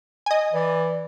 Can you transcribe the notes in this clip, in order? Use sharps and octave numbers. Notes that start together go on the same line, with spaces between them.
D#5 G#5
E3 D5